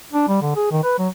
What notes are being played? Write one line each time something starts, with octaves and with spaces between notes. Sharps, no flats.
D4
G3
D3
G#4
D#3
B4
F#3